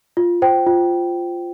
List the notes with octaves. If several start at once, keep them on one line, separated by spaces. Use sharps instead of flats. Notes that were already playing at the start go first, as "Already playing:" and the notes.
F4
C5 G5
F4